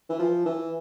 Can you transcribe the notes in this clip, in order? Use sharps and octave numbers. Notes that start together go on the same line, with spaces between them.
E3
F3
E3